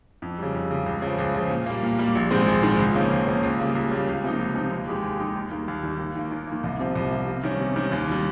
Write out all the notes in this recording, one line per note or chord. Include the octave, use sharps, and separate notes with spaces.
F2
C#3 G3
F2
C#3 G3
C#2
C#3 F3
C#2
C#3 F3
A#2
G3 A#3
A#2
G3 A#3
A#1
G#2 D#3 G#3 C4
A#1
G#2 D#3 G#3 C4
C#2
C#3 F3 A#3 C#4
C#2
C#3 F3 A#3 C#4
C#2
C#3 G3 A#3 F4
C#2
C#3 G3 A#3 F4
C#2
C3 F3 A#3 D#4
C#2
C3 F3 A#3 D#4
D#2
D#3 G#3 D#4 G4
D#2
D#3 G#3 D#4 G4
D#2
D#3 G3 A#3
D#2
D#3 G3 A#3
D#2
D#3 A#3
D#2
D#3 A#3
C2
C3 F3
C2
C3 F3
C3
D#3 G3 C#4
C3
D#3 G3 C#4
D#2
D#3 G3